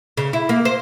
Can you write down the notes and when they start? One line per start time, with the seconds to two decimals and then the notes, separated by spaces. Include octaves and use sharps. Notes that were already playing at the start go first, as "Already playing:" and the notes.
0.17 C#3
0.33 E4
0.49 A#3
0.65 C5